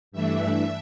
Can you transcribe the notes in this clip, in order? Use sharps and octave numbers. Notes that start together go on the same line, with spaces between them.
G2 E3 A3 D4 E5